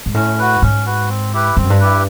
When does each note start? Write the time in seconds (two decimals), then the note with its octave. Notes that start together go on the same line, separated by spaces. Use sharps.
0.06 G#2
0.14 A2 C#4
0.39 F#4 B4
0.62 G#2 C#4
0.86 F#4 B4
1.08 C4
1.33 E4 G4 B4
1.56 G2 C4
1.64 F#2
1.70 G2
1.80 E4 G4 B4